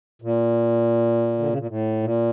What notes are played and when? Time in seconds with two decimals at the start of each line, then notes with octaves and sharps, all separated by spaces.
0.22 A#2
1.39 D3
1.49 C#3
1.58 A#2
1.67 A2
2.03 A#2